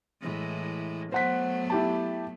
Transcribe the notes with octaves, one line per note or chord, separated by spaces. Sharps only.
A2 E3 G#3
F#3 A3 B3 C5 F#5 B6
E4 G4 A5